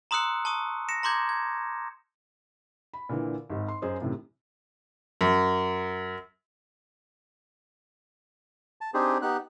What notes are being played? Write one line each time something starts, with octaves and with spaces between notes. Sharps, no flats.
A#5 C6 D#6 E6 F#6 C#7
A5 C#6 D#6
A#6 C#7 E7
A#5 C6 D6 G6 G#6
G#6
B5
A#2 D3 E3
G#1 G#2
C6
F#2 G#4 C5 D#5
F#2 A2 C3 D#3
F#2
A5
C4 D4 D#4 G4 G#4 C5
B3 D#4 G4 F#6